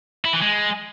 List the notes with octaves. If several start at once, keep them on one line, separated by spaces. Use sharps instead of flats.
E4
E3
G#3